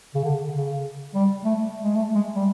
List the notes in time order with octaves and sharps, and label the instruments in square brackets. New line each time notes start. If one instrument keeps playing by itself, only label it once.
[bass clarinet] C#3
D3
C#3
G3
A3
G#3
A3
G#3
G3